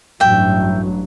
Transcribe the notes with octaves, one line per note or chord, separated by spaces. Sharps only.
A1 G2 F#3 E5 G5